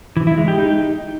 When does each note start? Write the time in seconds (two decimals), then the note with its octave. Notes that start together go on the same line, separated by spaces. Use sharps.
0.17 E3
0.27 E4
0.37 G#3
0.48 G4
0.58 D#4